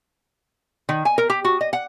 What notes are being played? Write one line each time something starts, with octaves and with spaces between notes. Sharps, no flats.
D#3
G#5
A#4
G4
F#4
D#5
F#5